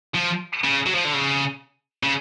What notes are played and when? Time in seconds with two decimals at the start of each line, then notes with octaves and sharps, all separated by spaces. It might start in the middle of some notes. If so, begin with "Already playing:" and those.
0.15 F3
0.64 C#3
0.86 F#3
0.95 F3
1.04 D3
1.13 C#3
2.03 C#3